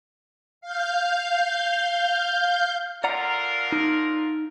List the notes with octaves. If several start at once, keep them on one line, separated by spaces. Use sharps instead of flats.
F5 G6
D3 F4 A#4 D5 F#5 A#5
D#4